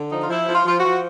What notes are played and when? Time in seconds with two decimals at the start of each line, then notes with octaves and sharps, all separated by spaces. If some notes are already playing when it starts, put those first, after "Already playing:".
Already playing: D3
0.11 F3 D#4
0.21 F4
0.30 F3 E4
0.47 F3
0.53 F4
0.65 F3 F4
0.78 F#4
0.85 F3